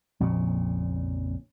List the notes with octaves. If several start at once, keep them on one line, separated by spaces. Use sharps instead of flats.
A#1 F2 A#2 C#3